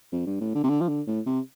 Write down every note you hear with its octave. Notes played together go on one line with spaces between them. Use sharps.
F2
G2
A2
D3
C3
D3
F3
D3
A2
C3